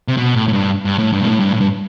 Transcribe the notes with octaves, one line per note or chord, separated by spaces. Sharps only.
C3
B2
A2
A2
G2
G2
A2
G2
B2
A2
G2
A2
G2